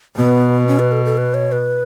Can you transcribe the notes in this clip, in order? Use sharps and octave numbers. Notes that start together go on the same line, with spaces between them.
B2 B3
C#4
B4
A4
A4
B4
C#5
B4